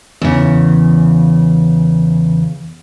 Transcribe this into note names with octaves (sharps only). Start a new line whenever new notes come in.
E2 C#3